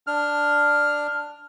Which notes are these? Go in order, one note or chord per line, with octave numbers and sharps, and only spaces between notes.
D4 F6